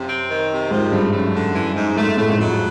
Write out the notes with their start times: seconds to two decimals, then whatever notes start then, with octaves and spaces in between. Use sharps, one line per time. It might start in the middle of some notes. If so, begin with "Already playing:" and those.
Already playing: F#2 C3
0.09 C4
0.29 D#3
0.51 C3
0.71 G#2 F3
0.92 G2 A3
1.13 F#2 A3
1.35 D3
1.55 E3
1.76 G#2
1.96 G#2 A3
2.07 G#2
2.17 A2 A3
2.29 G#2
2.38 F2 F#3